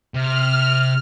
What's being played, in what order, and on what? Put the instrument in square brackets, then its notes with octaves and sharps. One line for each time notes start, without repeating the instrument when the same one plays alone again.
[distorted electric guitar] C3 [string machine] F6